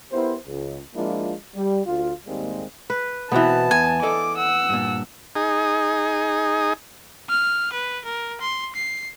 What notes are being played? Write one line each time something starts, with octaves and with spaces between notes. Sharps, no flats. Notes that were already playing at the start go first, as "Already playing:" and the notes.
B3 E4 G4 A#4 C5
C#2
F3 G#3 A#3 D4 E4 F4
G3
D2 F4
D#2 G#2 G3 G#3 A#3 C4
B4
B2 E3 B3 C4 F#4 A5
E2 G#5
A4 D5 D#5 D6
F#5 E6
G2 A#2
D#4 G#4
F6
B4
A#4
C6
C7